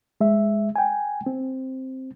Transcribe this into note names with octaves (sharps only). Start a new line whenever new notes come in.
G#3 E5
G5 G#5
C4